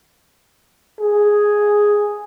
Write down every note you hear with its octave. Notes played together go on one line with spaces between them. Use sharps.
G#4